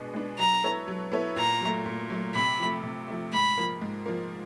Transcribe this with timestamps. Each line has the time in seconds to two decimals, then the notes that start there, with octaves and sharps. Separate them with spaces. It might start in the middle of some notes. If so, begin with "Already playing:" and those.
Already playing: B2 G#3 B3 D4
0.14 G#3 B3 D4
0.38 F#3 A#5
0.64 B3 E4 A4 C#5
0.88 F#3
1.12 B3 E4 A4 C#5
1.36 A#2 A#5
1.61 F#3 A3
1.86 A#2
2.10 F#3 A3
2.34 C3 B5
2.59 F3 A3
2.83 C3
3.08 F3 A3
3.33 G#2 B5
3.58 F3 A#3
3.82 G#2
4.06 F3 A#3